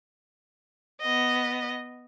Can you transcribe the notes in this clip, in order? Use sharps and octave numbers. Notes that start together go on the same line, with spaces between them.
B3 D#5